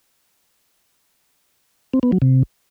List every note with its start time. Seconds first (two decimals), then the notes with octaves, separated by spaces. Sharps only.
1.94 C4
2.03 B3
2.12 F#3
2.22 C3